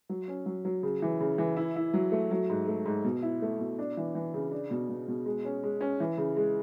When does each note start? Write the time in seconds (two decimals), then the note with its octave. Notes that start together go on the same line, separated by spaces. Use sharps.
0.09 F#3
0.28 C#4
0.46 F#3
0.65 F#3
0.83 C#3
1.02 E3
1.20 C#3
1.38 E3
1.56 E4
1.76 E4
1.94 F#3
2.12 A3
2.31 F#3
2.50 G#2
2.67 A3
2.86 G#2
3.04 B2
3.22 E4
3.42 A3
3.59 B2
3.79 D4
3.97 E3
4.15 E3
4.34 C#3
4.51 D4
4.71 B2
4.89 B2
5.08 B2
5.26 G#3
5.45 C#4
5.63 G#3
5.81 C#4
6.00 E3
6.18 C#3
6.36 G#3